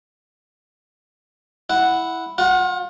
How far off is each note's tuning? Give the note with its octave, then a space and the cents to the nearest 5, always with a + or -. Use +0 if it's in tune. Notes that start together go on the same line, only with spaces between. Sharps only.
E4 +0 F#5 +0
F4 +35 F#5 +0